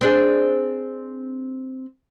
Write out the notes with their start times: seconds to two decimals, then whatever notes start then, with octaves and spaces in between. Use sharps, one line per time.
0.01 C4 D4 G#4